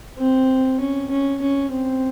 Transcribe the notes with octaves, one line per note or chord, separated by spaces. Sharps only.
C4
C#4
C#4
C#4
C4